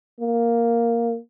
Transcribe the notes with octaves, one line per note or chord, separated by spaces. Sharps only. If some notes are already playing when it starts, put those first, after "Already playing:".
A#3